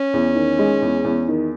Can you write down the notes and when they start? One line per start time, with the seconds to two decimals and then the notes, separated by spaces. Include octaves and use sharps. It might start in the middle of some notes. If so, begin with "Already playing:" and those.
Already playing: C#4
0.14 E2
0.35 D#3
0.59 G#3
0.82 E2
1.04 E2
1.28 D#3